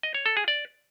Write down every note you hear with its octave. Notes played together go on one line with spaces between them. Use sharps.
D#5
C#5
A4
G#4
D5